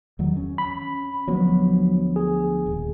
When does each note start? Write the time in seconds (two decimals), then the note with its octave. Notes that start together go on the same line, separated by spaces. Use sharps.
0.19 E2 D#3 F#3
0.37 C#4
0.58 B5
1.28 D2 F3 F#3 B3
2.16 G#4
2.66 D#1